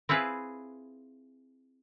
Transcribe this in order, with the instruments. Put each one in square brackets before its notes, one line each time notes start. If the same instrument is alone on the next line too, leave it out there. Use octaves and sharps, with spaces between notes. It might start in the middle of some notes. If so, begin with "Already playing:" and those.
[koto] C4 E4 F4 G#4 B4